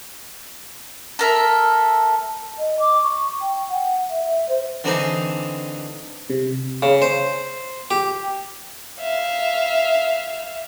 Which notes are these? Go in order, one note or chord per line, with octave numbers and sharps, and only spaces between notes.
A4 A#4 E5
D#5
D6
C#6
G5
F#5
E5
C5
D3 E3 C4 D4 D#4 G#4
C3
C#3
C5
G4
E5 F5